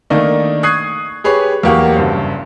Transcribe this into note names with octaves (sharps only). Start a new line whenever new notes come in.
D#3 A3 A#3 D4 D#4
C#6 D#6 F#6 G#6 C7
G4 G#4 B4 C#5
E2 F#3 A#3 G4 F#5 C#6
F#1 G2 C5